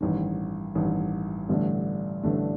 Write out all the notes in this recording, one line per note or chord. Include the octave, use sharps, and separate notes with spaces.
A1 G2 D#3
A1 G2 D#3
A1 G2 D3 A3 D4
A1 G2 D3 A3 D4